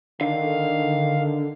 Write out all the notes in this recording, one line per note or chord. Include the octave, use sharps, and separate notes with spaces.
D3 D#3 F5